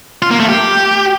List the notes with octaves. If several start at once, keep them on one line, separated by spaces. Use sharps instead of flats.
F4
A#3
A3
G4